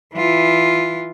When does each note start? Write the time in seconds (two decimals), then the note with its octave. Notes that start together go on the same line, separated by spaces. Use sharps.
0.15 E3 F4